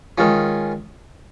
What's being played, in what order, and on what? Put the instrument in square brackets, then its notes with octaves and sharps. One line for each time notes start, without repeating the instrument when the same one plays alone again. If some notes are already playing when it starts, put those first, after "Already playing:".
[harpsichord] D#3 G#3 C#4 F4